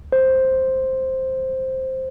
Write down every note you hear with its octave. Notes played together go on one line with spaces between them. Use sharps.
C5